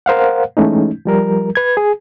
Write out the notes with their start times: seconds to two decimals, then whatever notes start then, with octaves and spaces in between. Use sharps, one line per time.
0.06 A#4 C5 F5 F#5
0.57 E3 G#3 A3 C#4 D#4
1.05 F3 G3 A#4
1.55 B4 G#6
1.77 G#4